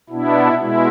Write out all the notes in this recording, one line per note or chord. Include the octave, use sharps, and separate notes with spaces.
B2 B3 D4 E4
B2 G#3 E4